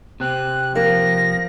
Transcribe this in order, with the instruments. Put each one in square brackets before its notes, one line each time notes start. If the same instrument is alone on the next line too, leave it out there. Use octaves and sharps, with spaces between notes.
[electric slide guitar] C3 C4 [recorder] F#6
[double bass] F3 [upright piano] A#3 [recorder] A#6